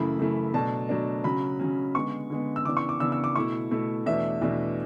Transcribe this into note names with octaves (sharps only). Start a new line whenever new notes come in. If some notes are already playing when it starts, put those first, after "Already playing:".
Already playing: F#2 C#3 E3 A3 E4 B5
F#2 C#3 E3 A3 E4
B2 F#3 A3 D4 A5
B2 F#3 A3 D4
C#3 F#3 C#4 B5
C#3 F#3 C#4
D3 G#3 B3 C#6
D3 G#3 B3
E6
C#3 E3 B3 D4 D6
C#6
D6
C#3 E3 B3 D4 E6
E6
D6
B2 A3 E4 C#6
B2 A3 E4
E2 B2 A3 D4 E5
E2 B2 A3 D4